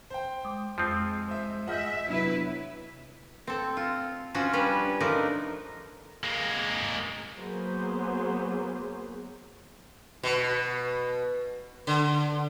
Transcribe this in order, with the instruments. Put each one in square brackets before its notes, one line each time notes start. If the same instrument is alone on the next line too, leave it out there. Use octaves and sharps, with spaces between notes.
[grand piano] C5 G5
[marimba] G#3 D6 D#6
[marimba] F2 D#6 [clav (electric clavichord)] F3 C4 [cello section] G#3
[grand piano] C5 E5
[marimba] F4 F6 G6 [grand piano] G#4 D#5 F#5 [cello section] E5
[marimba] C3 B3 D4 [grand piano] F#3 [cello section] E4 B4
[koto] C4 A4
F4
F3 C#4 F4 F#4
G3 C#4 D4 B4
F3 A3 D4 D#4 A#4
[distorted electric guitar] G#3 A#3
[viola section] F#3 A#3 B3 G#4 C5
[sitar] B2
D3